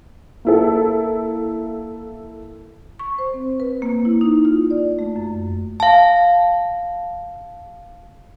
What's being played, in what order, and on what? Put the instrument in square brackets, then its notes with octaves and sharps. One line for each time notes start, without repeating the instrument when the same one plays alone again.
[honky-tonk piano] A#3 E4 A4
[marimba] C#6
C5
C4
B4
A#3
E4
D#4
F4
D5
A3
F#2
[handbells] F5 A5